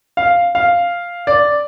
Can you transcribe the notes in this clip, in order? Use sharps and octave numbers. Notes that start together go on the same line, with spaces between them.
F5
F5
D5